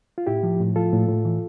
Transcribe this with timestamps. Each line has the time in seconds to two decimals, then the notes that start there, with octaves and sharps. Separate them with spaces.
0.18 F4
0.27 A2 E4 G4
0.43 F3
0.60 A2
0.76 F3 F4 A4
0.93 A2
1.09 A2
1.25 E3